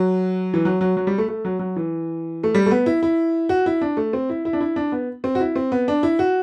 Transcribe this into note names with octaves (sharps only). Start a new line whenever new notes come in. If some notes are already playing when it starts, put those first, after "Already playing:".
Already playing: F#3
E3
F#3
F#3
F#3
G3
A3
A3
F#3
F#3
E3
A3
G3
A3
B3
E4
E4
F#4
E4
D4
A3
C4
E4
E4
D4
E4
D4
B3
C4
F#4
E4
C4
B3
D4
E4
F#4